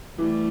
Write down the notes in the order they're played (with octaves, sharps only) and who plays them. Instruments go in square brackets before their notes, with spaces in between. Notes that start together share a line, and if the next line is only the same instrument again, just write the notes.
[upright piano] E3 [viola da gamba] G3 A3